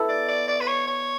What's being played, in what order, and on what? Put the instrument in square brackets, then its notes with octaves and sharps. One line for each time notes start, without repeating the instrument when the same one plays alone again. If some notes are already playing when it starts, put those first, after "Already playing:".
Already playing: [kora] B3 E4 A4
[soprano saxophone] D5
D5
D5
B4
C#5
C#5